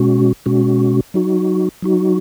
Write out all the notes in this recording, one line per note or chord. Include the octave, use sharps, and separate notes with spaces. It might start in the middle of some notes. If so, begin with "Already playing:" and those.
Already playing: B2 G#3 C#4 F#4
B2 G#3 C#4 F#4
F#3 D#4 F#4
F#3 D#4 F#4